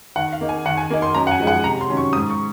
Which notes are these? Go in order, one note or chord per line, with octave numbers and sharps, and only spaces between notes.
D#3 F#5
F5
A#3 D#4
G#5
D#3 F#5
G#5
A#3 D#4
C6
F#2 A#5
F#5
G#5
F3 G#3 D#4
F#5
C3 A#5
C6
D#3 F#3 C#4
C#6
G#2 D#6
C#6